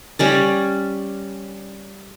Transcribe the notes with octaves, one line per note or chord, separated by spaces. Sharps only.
G3 C#4 D5